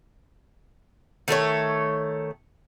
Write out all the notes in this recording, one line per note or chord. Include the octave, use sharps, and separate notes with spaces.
D#3 A3 A4 C#5